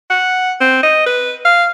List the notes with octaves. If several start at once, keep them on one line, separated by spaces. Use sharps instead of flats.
F#5
C4
D#5
B4
F5